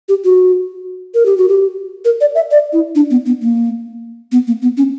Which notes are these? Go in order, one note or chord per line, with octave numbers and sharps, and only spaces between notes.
G4
F#4
A#4
G4
F#4
G4
A#4
D5
E5
D5
E4
D4
B3
B3
A#3
B3
A#3
B3
C#4